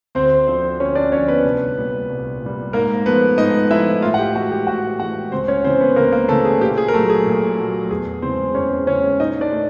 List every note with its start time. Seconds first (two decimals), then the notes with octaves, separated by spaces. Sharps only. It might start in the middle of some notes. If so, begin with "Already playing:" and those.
0.15 D2 C4 C5
0.47 D3 F3 C4 C5
0.80 D2 C#4 C#5
0.95 D4 D5
1.12 D3 F3 C#4 C#5
1.28 B3 B4
1.45 C2
1.77 A#2 G3
2.10 C2
2.42 A#2 G3
2.73 G#2 A#3 A#4
3.06 F3 A3 B3 B4
3.38 G#2 D#4 D#5
3.70 F3 A3 E4 E5
4.02 A2 F4 F5
4.14 F#5
4.18 G4 G5
4.35 E3 G#3 F#4 F#5
4.51 G4 G5
4.67 A2 F#4 F#5
5.00 E3 G#3 F#4 F#5
5.32 C#2 C4 C5
5.48 C#4 C#5
5.64 C#3 E3 C4 C5
5.80 B3 B4
5.96 C#2 A#3 A#4
6.12 A#3 A#4
6.28 C#3 E3 A3 A4
6.45 G#4
6.61 A#2 G4
6.78 G#4
6.88 A#4
6.94 F#3 A3 A4
7.10 G#4
7.26 A#2
7.58 F#3 A3
7.91 E2 G#4
8.22 C#3 E3 G#3 C4 C5
8.55 E2 C#4 C#5
8.87 C#3 E3 G#3 C#4 C#5
9.19 A#2 D#4 D#5
9.41 D4 D5
9.52 A3